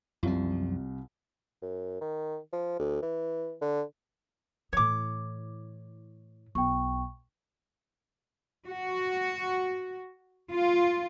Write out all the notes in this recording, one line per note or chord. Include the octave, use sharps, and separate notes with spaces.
C2 F#2 C3 F3 F4
F#2
D#3
F3
D2
E3
D3
A2 E3 C#5 D6
B1 G5 C#6
F#4
F4